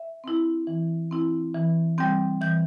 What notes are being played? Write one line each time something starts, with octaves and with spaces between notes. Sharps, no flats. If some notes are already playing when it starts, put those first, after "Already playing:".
Already playing: E5
C4 E4
E3
C4 E4
E3
G3 C4 G6
E3 G6